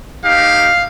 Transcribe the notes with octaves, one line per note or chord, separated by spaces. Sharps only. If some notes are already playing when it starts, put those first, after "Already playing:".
A#3 D#4 G4 F5